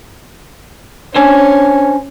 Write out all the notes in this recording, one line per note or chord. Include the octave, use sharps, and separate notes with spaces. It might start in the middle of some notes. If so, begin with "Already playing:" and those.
C#4 D4 C5 G#5